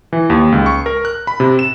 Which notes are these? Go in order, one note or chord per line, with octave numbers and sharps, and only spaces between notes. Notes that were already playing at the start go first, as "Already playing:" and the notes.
E3
D#2
C#2
C#6
A#4
F#6
B5
C3
E7